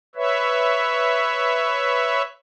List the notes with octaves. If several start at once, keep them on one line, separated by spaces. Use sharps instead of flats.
B4 C#5 E5